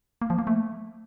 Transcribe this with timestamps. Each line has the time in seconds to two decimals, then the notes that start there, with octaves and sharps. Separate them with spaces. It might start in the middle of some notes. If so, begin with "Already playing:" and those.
0.22 A#3
0.30 F3
0.39 A#3
0.47 A3